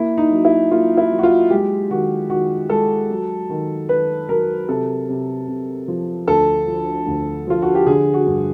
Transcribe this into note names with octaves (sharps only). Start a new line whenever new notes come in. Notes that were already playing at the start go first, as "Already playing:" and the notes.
Already playing: A#3 E4
D#4
F#3
E4
A#3 F4
E4
F#3
F#4
F4
G#3 G4
D#3 F#4
D#3 F#4
G#3 A4
F#3
D#3
D#3 B4
F#3 A#4
C3 A4
C3
C3
F3
D2 A4
F3
D2
F3 F4
F#4
G4
D3 G#4
F#4
G2